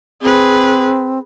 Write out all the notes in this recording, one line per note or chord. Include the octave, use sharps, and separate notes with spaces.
C4 G#4 B4